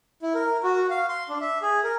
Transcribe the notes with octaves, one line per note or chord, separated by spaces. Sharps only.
E4
A#4
F#4
F5
C6
D4
E5
G#4
A#4